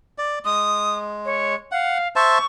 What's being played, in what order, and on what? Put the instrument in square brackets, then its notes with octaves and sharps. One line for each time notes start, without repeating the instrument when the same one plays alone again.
[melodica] D5
[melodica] G#3 [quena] D#6
[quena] C#5
[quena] F5 [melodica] F#5
[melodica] C5 E5 A5 [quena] C#6